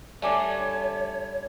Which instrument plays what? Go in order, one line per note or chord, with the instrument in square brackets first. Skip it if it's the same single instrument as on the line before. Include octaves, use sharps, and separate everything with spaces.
[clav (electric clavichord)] D3 G3 A3 [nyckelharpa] A4 [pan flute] C#5 [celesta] D5 G#5 D6